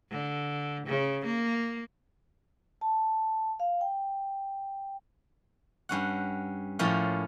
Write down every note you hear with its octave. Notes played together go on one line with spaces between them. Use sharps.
D3
C#3
A#3
A5
F5
G5
G2 C#4 F#5
A2 F3 A3 A#3 C#4